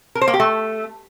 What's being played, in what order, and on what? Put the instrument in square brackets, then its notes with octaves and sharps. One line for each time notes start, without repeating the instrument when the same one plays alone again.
[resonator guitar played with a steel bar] A#4
C5
A#3
G4
A3